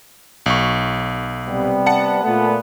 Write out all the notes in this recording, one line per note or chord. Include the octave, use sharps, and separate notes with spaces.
B1 C#6
C3 G3 B3
F#5 A5 C#7
A#2 A3 B3